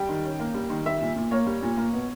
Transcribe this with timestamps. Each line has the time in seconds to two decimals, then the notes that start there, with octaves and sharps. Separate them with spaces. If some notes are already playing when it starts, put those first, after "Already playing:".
Already playing: G3 G5
0.09 D#3
0.24 C#4
0.39 A#3
0.54 G3
0.70 D#3
0.86 G3 E5
1.01 A#2
1.16 A#2
1.31 A#3 C#5
1.46 G3
1.62 A#2
1.77 A#3
1.93 B2